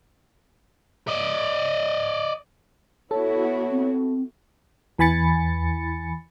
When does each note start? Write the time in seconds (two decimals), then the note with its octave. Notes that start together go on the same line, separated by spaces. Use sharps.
1.08 D5 D#5
3.11 B3 E4 F#4 A4 C#5
3.70 C4
4.99 E2 E3 G#5 B5 A6 C#7